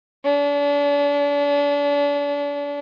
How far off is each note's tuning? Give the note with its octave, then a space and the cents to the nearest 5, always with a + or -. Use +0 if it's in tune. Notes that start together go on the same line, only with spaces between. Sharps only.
D4 -40